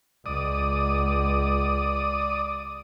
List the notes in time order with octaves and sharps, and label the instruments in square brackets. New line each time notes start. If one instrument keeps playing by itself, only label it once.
[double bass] C#2 [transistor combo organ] D5 D#6